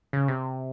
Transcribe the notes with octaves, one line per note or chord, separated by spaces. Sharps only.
C#3
C3